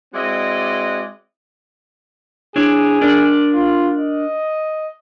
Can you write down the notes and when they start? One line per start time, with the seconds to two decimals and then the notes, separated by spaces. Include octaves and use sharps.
0.14 G#3 C4 E4 F#4 D5 D#5
2.56 D4 E4 G#4 C#5
3.01 D4 A#4 D5
3.53 F4
3.97 D#5